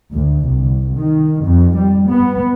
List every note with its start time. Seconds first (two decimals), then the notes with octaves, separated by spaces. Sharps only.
0.11 D2
0.45 C2
0.98 D#3
1.44 F2
1.77 G3
2.08 B3